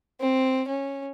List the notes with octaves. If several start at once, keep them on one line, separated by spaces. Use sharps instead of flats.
C4
C#4